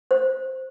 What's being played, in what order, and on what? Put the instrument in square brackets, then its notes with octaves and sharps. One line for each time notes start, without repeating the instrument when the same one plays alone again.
[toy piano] C5